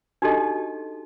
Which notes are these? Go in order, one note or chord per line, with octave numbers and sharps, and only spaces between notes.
D4 D#4 F#4 G4 A4 D#5